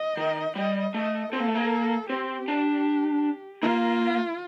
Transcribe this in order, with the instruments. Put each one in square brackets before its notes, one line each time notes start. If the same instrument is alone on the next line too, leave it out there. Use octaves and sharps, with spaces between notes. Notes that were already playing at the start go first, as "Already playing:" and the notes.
Already playing: [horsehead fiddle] D#5
[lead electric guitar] D#3
[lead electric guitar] G3 [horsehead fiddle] D#5
[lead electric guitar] A3 [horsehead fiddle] D#5
[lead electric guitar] C4 [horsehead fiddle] A4
[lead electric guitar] A#3
A3
A#3
[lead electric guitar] C4 [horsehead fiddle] G4
[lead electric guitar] D4
[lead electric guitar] A#3 [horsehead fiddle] F4